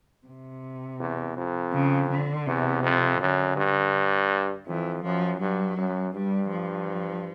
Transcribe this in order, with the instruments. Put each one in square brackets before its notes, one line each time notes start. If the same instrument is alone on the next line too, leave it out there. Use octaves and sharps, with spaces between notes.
[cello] C3
[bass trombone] E2
F2
[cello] C#3
D3
[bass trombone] E2 [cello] C3
[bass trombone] F2
[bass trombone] F#2 [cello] D3
[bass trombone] G2
[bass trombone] F2 [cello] E3
[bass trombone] F#2 [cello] F3
[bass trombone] G2 [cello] F#3
[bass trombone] F#2
[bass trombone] G2 [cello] G3
[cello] F3